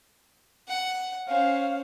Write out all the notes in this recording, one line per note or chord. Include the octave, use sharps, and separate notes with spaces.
F#5
C#4 C5 F5